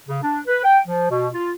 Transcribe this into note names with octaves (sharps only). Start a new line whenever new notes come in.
C#3
D4
B4
G5
F3
B2
F4